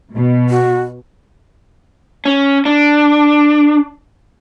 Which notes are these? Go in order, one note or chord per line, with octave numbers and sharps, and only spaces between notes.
B2
F#4
C#4
D4